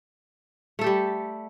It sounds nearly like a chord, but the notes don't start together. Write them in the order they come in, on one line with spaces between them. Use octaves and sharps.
A3 A4 G4 G3